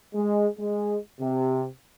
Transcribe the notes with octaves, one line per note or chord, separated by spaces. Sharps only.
G#3
G#3
C3